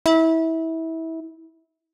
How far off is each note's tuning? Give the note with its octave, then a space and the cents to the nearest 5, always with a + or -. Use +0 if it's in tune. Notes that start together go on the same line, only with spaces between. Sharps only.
E4 -25